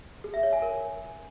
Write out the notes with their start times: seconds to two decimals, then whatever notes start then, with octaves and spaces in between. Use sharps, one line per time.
0.24 G#4
0.34 E5
0.43 C#5
0.53 G#5
0.62 A#4